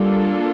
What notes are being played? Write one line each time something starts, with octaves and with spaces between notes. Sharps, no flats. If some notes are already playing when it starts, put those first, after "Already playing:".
Already playing: G3 A#3 D4 F4 A4